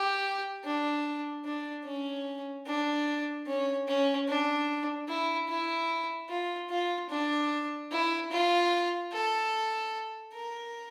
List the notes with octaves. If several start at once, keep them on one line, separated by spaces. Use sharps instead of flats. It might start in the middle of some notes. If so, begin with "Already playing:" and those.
Already playing: G4
D4
D4
C#4
D4
C#4
C#4
D4
E4
E4
F4
F4
D4
E4
F4
A4
A#4